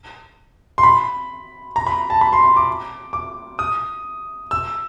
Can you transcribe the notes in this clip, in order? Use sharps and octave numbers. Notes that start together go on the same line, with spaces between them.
C6
B5
A#5
B5
A5
B5
C6
C6
D6
D6
D#6
E6